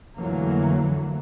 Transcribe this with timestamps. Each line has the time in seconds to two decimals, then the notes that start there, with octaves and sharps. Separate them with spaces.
0.16 F2 D3 E3 F#3 A3 A#3